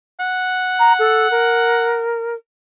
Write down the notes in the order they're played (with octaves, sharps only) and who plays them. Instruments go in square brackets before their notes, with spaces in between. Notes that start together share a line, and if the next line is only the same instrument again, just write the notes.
[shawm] F#5
[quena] A#5
A4
A#4